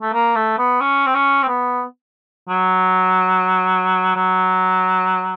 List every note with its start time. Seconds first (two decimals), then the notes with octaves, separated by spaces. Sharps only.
0.02 A3
0.13 A#3
0.36 A3
0.59 B3
0.81 C#4
1.06 C4
1.14 C#4
1.42 C4
1.48 B3
2.49 F#3
4.16 F#3